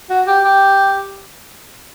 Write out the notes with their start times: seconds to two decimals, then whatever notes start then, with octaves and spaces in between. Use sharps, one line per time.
0.10 F#4
0.27 G4
0.44 G4